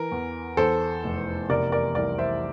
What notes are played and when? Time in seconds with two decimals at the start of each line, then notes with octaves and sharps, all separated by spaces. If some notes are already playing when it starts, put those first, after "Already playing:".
Already playing: E3 A#4
0.12 E2
0.57 E2 A4 C5
1.04 F1
1.49 C3 A#4 D5
1.72 A#4 D5
1.95 C2 A#4 D5
2.18 C5 E5